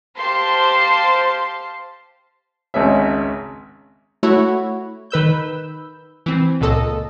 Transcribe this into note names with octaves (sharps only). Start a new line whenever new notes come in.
G4 C5 F5 A5 C6 C7
G#1 C#2 C#4 E5
A3 E4 F#4 C#5
D#3 B4 E6 G6
E3 C4
C#2 A#2 A4 D#5